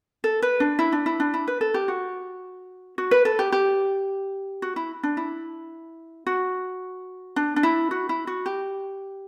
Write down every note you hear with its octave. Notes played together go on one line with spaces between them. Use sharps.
A4
B4
D4
E4
D4
E4
D4
E4
B4
A4
G4
F#4
F#4
B4
A4
G4
G4
F#4
E4
D4
E4
F#4
D4
D4
E4
F#4
E4
F#4
G4